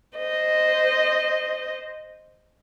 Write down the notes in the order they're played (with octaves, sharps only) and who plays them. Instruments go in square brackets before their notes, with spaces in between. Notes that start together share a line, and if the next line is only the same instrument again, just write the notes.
[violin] C5 D#5